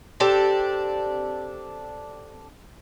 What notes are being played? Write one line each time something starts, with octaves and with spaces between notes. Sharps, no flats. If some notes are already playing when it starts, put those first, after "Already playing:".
C4 D4 G4 A4